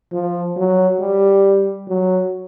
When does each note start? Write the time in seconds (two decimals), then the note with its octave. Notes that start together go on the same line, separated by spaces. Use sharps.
0.12 F3
0.56 F#3
1.00 G3
1.88 F#3